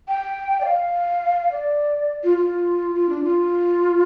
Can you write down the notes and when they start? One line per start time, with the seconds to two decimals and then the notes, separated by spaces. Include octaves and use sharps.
0.08 G5
0.61 D5
0.65 F5
1.52 D5
2.24 F4
2.38 F4
2.95 F4
3.09 D4
3.24 F4